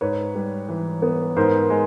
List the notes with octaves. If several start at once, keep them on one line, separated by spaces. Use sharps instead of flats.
G#2 B4 C#5
G3
E3
B3
G#2 A#4 C5
G#3